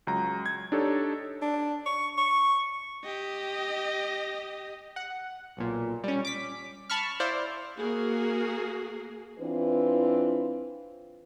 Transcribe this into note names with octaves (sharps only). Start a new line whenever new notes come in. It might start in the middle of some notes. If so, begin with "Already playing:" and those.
C#2 F#3 A#5
G#6
D4 D#4 G4 A4 C#5
D4
C#6
C#6
G4 D#5
F#5
B1 A#2
G3 C#4
D6 B6
A5 B5 C#6 F6
E4 C5 D5 F5
A#3 F#4 G#4
E3 C4 D4 F4 B4